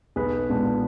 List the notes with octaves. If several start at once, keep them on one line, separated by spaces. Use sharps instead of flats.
B1 G#4 B4
A#2 G#3 B3 D4